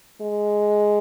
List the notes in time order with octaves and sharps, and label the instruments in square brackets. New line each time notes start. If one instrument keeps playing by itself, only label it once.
[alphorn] G#3